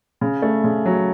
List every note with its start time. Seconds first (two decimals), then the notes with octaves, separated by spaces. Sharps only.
0.21 C#3
0.42 A3
0.64 C#3
0.86 F#3